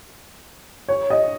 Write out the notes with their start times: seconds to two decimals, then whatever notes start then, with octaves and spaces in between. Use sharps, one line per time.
0.88 C#5
1.10 D#5